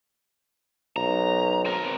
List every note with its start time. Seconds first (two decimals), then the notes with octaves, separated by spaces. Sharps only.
0.96 B1 A#5
1.65 C4 A#4